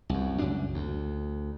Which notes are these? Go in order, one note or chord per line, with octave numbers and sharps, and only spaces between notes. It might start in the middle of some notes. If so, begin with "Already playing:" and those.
C2 F#2
C#2 F#2 D4
D2